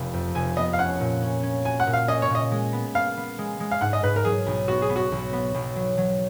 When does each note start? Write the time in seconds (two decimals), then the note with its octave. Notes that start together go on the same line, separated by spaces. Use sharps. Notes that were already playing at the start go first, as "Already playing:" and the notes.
Already playing: F1 B3
0.13 F2
0.35 F1 G#5
0.57 B3 D#5
0.73 F5
0.79 C#4 F#5
1.00 A#2
1.22 C#4
1.43 C#4
1.65 F#4 G#5
1.80 F#5
1.87 A#2
1.93 F5
2.08 C#4 D#5
2.22 C#5
2.30 A#2
2.35 D#5
2.51 G#3
2.73 B3
2.95 B3 F5
3.17 B3
3.39 G#3
3.60 G#3
3.71 F5
3.81 G#2 F#5
3.93 D#5
4.03 G#2 B4
4.16 A#4
4.25 F#3 G#4
4.46 B1
4.68 B3 F#4
4.82 G#4
4.90 B3
4.96 F#4
5.12 B1
5.33 B3
5.54 B1
5.76 F#3
5.98 F#3